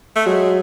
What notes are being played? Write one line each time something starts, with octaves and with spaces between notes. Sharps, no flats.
A3
F#3 G#3